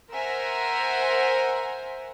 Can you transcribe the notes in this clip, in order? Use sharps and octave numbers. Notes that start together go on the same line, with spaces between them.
A#4 C5 E5 F#5 G#5 A#5